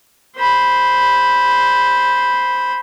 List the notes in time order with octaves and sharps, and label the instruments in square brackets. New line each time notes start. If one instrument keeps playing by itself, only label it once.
[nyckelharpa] C5 B5